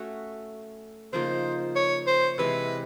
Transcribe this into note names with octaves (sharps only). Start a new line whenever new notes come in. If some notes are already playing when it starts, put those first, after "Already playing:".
Already playing: A3 C#4 F#4
C#3 F3 A#3 D#4 C5
C#5
C5
C3 E3 G#3 B4